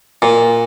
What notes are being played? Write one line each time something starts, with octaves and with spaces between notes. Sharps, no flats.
A#2